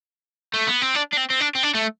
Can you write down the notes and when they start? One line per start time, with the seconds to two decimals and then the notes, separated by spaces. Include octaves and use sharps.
0.54 A3
0.67 B3
0.82 C4
0.95 D4
1.13 D4
1.17 C4
1.30 C4
1.40 D4
1.55 C4
1.63 D4
1.75 A3